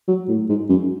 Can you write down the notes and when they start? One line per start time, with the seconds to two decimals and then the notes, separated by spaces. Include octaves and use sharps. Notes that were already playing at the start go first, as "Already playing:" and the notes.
0.08 F#3
0.28 A2
0.49 G#2
0.69 F#2